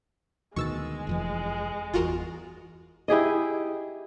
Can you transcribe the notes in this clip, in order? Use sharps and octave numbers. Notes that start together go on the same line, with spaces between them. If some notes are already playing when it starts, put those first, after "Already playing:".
D2 B2 D#3 G#3 C#6 E6 A6
F1 F2 E3
G1 E2 F4 F#4 A#4
E4 G4 G#4 D#5